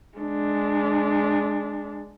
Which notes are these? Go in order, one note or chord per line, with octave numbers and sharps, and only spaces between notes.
G#3 D4